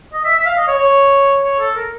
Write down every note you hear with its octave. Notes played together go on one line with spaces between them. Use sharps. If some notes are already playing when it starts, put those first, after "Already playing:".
D#5
E5
E5
F5
D#5
C#5
C#5
C#5
A4
A#4